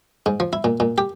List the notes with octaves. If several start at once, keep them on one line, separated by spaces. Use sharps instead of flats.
G#2
F3
E4
A#2
A#2
G4